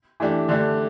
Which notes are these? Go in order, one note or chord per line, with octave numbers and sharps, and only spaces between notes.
E3 A3 D4 G4
D3 A3 D4 G4